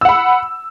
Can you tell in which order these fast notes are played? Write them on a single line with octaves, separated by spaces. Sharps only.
E6 F#5 B5